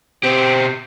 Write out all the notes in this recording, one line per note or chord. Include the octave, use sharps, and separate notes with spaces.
B2 C4 G4